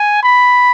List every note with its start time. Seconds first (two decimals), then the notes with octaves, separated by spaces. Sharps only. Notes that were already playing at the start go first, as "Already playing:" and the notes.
Already playing: G#5
0.23 B5